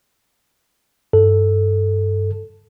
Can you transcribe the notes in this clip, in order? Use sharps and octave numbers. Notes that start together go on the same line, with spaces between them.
G2 A4